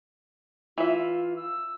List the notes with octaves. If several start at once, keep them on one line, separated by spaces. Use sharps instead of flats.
E3 F4 E5
E6